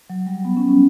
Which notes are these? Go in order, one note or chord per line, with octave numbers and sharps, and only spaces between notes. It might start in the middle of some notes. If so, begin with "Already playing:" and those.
F#3
G3
B3
C#4
C#4